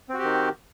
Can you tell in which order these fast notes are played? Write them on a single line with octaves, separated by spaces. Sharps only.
C4 F#4 G4 D#3